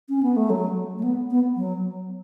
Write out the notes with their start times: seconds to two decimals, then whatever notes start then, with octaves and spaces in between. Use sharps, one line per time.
0.09 C#4
0.23 B3
0.36 A3
0.50 F#3
0.98 A3
1.03 B3
1.30 B3
1.57 F#3